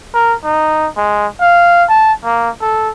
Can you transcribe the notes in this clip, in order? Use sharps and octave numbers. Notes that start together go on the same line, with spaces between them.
A#4
D#4
G#3
F5
A5
A#3
A4